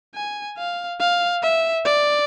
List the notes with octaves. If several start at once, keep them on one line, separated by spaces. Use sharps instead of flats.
G#5
F5
F5
E5
D5